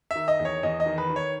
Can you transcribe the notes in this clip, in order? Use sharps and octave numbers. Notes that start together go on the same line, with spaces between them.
D#3 E5
D#5
E2
C#5
E2 D#5
D#5
D#3
B4
D#3
C#5